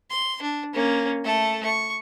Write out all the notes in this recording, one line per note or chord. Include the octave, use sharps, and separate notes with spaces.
C6
D4
A#3 C#4
A3 A4
C#6